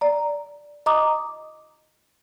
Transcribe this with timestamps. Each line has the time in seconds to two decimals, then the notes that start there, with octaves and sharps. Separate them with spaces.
0.01 D5 A#5
0.86 D#5 A#5 D6 D#6